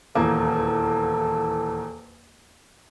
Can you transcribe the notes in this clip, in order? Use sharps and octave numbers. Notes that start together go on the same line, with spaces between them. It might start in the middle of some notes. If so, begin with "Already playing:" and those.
D#1 E2 A#3 A4